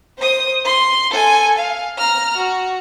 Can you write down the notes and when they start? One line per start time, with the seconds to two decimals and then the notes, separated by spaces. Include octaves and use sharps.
0.19 C5 D#6
0.65 C6
1.11 A4 G#5
1.58 F5
1.98 A#5 F6
2.37 F#4